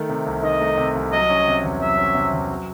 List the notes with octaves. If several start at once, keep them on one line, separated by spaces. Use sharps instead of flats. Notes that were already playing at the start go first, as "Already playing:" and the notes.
Already playing: D#3 A3
C3
C2
D#3 D#5
A3
C3
C2
F#3 D#5
C#4
C3
E2
F#3 E5
C#4
C3
E2
F#3